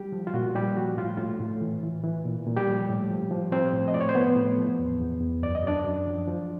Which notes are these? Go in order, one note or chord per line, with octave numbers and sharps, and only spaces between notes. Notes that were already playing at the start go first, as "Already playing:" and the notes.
Already playing: G3 G4
F3
F4
A#2 F#4
A#2 G3 G4
F3 F#4
A2 F4
A2 F4
A2
E3
E3
E3
A#2
A#2
G3 G4
F3
A2
F3
F3
F3 C4 C5
A2
D#5
A2 D5
C#5
C5
F3 B3 B4
A2
F3
E2
E2
E2
F#2 D5
D#5
F#2 D4 D5
F#2
F3
F3